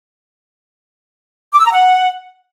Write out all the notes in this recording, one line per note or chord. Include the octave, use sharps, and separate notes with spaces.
D6
E6
A#5
F#5